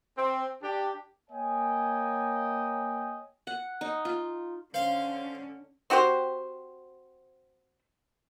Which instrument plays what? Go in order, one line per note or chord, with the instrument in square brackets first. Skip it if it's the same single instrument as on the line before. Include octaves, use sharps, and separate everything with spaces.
[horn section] C4
D4 G4
[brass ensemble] A#3 C#5 D#5 G5 G#5
[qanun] F#5
D#4
F4
[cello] D3 C#4 [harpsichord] C5 F5
[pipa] C4 F#4 G4 C5